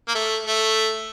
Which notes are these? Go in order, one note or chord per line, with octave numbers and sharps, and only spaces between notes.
A#3
A3
A3